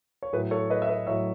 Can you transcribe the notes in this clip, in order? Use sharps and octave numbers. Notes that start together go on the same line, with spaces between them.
C#5
A2 F#3 G#4 B4
A4 C#5
B4 D#5
E5
B4 D#5
A2 F#3 C#5 E5